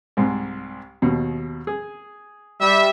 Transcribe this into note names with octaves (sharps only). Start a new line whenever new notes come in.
C2 G#2
D#2 B2
G#4
G3 E5